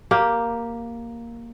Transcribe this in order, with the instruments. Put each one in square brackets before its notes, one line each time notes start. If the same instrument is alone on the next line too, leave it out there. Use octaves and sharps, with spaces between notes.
[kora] A#3 G4